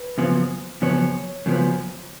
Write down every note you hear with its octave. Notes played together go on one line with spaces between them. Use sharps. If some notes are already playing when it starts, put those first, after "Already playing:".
Already playing: B4
F#2 C#3 F3 B3
F#2 C#3 F3 B3 C#5
F#2 C#3 F3 B3